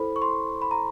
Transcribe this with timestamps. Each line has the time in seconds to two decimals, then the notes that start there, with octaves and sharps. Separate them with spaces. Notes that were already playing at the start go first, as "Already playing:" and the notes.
Already playing: E4 A4 C5 B5
0.16 C#6
0.22 C6
0.62 B5
0.71 A#5